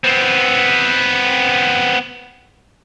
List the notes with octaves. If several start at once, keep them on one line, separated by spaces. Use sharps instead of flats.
B3 C4